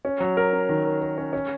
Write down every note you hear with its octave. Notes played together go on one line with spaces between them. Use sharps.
C#4
F#3
A#4
C#4
D#3
A#4
A#4
C#4
C#4